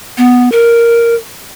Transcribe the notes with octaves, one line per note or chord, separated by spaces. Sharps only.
B3
A#4